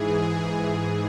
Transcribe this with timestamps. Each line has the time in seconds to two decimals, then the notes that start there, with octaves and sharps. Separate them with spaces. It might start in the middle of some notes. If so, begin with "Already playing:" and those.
Already playing: G#2 E3 G#4